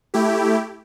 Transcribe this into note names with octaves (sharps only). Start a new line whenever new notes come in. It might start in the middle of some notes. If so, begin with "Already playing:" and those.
A3 E4 G4